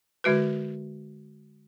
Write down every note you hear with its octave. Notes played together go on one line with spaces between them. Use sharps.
D3 G#3 F#4 B4